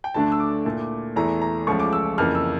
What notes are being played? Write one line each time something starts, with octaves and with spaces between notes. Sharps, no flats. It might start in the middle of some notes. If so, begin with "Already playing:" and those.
G5
D2 D3 A3 D4 A5
E6
D6
A#2 A3 E4
E2 E3 A3 E4 A#5
A#5
C#2 C#3 F3 A3 C#6
D6
E6
F2 C#3 E3 A#3 F6
E6